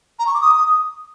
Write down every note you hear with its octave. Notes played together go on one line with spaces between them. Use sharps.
A#5
C#6
D6
D#6